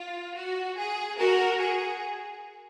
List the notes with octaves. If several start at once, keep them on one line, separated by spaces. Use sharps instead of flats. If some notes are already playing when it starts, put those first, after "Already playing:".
Already playing: F4
F#4
G#4
F#4 A#4
G#4